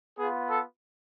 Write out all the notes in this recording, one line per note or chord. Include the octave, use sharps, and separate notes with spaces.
B3 F4 G#4
A4